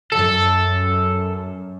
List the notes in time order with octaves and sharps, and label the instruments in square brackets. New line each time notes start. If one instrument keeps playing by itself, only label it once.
[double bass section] F#2 [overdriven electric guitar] A4